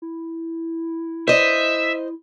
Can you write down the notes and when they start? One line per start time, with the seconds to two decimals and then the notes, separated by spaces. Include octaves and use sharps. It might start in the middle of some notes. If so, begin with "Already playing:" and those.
0.02 E4
1.28 C5 D#5 E5